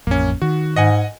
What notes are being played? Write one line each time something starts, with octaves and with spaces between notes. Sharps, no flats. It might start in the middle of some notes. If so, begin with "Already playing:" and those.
A1 F2 A#3 C#4
D#3 F#4
G#2 D#5 F#5 G#5